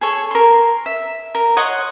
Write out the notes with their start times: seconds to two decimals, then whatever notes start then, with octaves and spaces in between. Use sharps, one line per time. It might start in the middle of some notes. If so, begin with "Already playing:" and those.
0.01 G#4 A4 C#5
0.31 A#4 C6
0.86 E5
1.35 A#4
1.57 C#5 D#5 F#5 C6